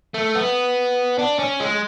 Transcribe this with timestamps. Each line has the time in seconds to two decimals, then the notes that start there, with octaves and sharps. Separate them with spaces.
0.14 A3
0.35 B3
1.19 D4
1.39 C#4
1.60 G#3